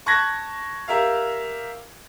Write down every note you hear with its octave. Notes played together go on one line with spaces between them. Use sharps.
A5 C#6 F#6 G#6 A#6
G4 A#4 E5 F5